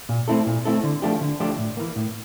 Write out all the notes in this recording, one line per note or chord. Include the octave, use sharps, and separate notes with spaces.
A#2
A3 C4 E4 A4
A#2
A3 C4 E4 A4
D3
F3 A3 D4 G4
D3
F3 A3 D4 G4
A2
E3 A#3
A2